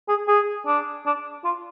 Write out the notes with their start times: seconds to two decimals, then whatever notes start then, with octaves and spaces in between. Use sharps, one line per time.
0.08 G#4
0.28 G#4
0.66 D4
1.06 D4
1.45 F4